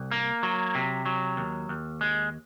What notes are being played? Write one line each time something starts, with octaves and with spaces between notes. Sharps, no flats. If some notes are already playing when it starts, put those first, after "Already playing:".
Already playing: C2
A#3
F#3
C3
F#3
D#2
D#2
G#3